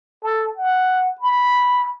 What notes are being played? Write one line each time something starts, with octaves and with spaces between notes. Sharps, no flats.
A4
F#5
B5